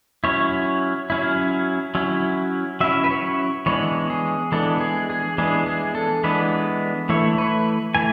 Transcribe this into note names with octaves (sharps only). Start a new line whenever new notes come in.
F#3 C#4 E4 C#5
F#3 C#4 E4
F#3 C#4 E4
F#3 C#4 E4 E5
B4
C#5
E3 G#3 B3 D4 C#5
G#4
E3 G#3 B3 D4 A4
G#4
G#4
E3 G#3 B3 D4 G#4
G#4
A4
E3 G#3 B3 D4 B4
E3 A3 E4 C#5
B4
E3 A3 G#5